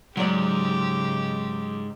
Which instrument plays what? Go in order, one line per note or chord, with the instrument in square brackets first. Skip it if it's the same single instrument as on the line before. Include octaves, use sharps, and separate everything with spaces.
[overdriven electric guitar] E2 G#2 [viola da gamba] C#3 G4 [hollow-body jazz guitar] F#3 D5